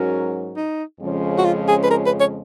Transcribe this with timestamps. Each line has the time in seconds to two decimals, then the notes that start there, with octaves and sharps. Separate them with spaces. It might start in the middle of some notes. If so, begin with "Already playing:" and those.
Already playing: G#2 F#3 C#4 F#4 A#4
0.57 D#4
1.01 F2 C#3 F3 G#3 C#4
1.38 F#4
1.45 F4
1.68 G#4
1.83 B4
1.90 A#4
2.06 B4
2.20 C#5